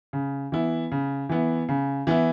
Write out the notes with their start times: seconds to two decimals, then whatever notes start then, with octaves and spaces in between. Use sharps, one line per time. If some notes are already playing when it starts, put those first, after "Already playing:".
0.13 C#3
0.52 E3 B3 E4
0.92 C#3
1.29 E3 B3 E4
1.69 C#3
2.07 E3 B3 E4